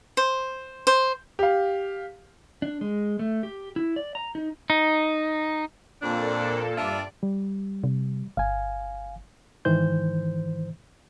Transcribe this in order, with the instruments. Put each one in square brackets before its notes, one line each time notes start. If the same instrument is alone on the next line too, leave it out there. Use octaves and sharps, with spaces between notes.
[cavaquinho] C5
C5
[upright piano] G4 F5
[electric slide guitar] D4
G#3
A3
G4
E4
D5
A#5
D#4
[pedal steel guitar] D#4
[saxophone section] F2 D4 [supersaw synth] A#2 A#3 A4
[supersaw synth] G2 D5 [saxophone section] D4 F4 E5
[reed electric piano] G3
[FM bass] C3
[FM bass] G1 [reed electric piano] F5 G#5
[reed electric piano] G#2 D#3 E3 C5 G6